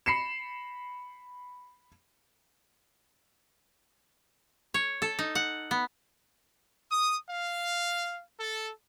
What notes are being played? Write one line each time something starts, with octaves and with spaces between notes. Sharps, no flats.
B5 C7 C#7 E7
C#5
A4
D#4
F#5
B3
D#6
F5
A4